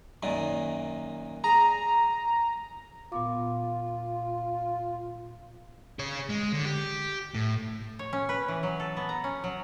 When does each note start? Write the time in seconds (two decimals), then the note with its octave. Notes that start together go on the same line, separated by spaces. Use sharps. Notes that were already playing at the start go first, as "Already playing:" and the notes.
0.23 F#2 A#2 D#3
1.44 G#4 A#5
3.12 A#2 B3 F4 D6
5.99 G#4 C#5
6.29 G#3
6.54 D3
6.65 G4
7.35 A2
7.99 C#5
8.13 C#4
8.29 B4
8.48 E3
8.63 F#3
8.80 A4
8.97 B3
9.09 A#5
9.24 C#4
9.44 F#3